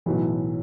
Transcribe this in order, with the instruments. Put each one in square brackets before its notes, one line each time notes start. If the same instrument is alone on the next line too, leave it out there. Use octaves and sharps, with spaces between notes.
[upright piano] B1 A2 E3 F#3